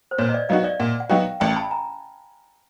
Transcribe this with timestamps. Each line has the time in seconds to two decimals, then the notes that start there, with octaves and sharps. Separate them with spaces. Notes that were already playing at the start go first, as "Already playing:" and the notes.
0.11 C5
0.18 A#2 B4 C#5
0.29 D#5
0.34 D5 E5
0.49 F#3 B3 D#4 F#4 D#5 F5
0.64 D5 E5
0.79 A#2 E5 F#5
1.00 F#5
1.10 F#3 B3 D#4 F#4 F5 G5
1.40 A1 G5 A5
1.56 A5 B5
1.71 G#5 A#5